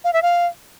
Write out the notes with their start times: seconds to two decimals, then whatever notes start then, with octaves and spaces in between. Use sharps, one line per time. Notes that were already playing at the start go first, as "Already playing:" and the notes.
0.04 F5
0.13 E5
0.22 F5